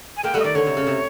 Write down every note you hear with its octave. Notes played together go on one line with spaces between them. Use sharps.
G#5
G#3 A#3 G5
G3 A3 F#5
D#5
D#3 D5
D3 C#5
C3
C#3
C3